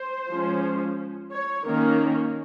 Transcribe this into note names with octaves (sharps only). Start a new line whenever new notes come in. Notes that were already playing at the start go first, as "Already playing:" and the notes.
Already playing: C5
F3 G#3 C#4
C#5
D#3 A#3 C#4 A#4